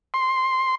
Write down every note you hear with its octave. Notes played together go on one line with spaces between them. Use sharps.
C6